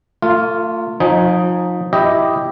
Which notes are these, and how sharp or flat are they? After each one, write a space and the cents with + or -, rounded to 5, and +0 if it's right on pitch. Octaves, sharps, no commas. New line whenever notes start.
A3 +40 F4 +0
F3 +35 D#4 +0 G#5 +0
E4 +0 G4 +0 D#5 +0